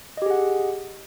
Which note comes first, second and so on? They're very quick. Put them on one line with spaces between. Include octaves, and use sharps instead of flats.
D#5 G4 G#4 F#5